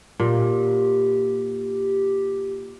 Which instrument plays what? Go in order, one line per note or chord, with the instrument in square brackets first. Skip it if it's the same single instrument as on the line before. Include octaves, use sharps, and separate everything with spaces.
[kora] A#2 [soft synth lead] G4